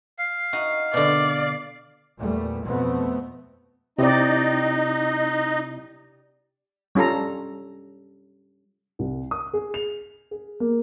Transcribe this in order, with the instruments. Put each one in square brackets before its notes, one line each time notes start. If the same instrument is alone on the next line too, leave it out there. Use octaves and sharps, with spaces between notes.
[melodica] F5
[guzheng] D#4 F#4
[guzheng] B2 D3 [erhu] D5
[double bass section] E2 A#2 G3 A3
F2 B2 A3 B3 C4
[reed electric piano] C3 C4 E4 [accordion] D#4 D#5 [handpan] G4 D5
[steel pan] G3 C#4 F4 A4 A#5
[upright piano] C2
D#6
G#4
F7
G#4
A#3